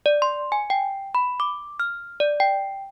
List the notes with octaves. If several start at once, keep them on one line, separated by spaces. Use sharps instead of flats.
D5
C6
G#5
G5
B5
D6
F6
D5
G5